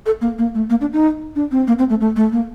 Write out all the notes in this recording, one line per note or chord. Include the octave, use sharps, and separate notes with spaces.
A4
A#3
A#3
A3
A#3
D4
D#4
D4
C4
A#3
C4
A3
A3
A3
A#3